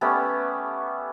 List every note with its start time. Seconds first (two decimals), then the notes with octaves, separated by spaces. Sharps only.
0.01 G3 A3 B3 C#4